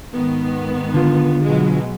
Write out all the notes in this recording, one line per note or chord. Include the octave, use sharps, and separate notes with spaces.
G#2 D#3 B3
D3 F4
B2 F#3 G#3